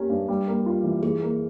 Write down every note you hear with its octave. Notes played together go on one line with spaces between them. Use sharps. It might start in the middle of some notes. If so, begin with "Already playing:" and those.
Already playing: A#3 C#4 G4
G2
G3
A#3
F4
E3
E3 G#4
A#3